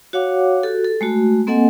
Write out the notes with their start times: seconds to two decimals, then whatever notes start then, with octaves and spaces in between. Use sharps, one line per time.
0.13 F#4 C#5 F5 F#5 D6
0.63 F#4 G4 A4
0.85 A4
1.01 G#3 A3 F#4
1.47 A#3 C4 A4 D#5 F#5 G#5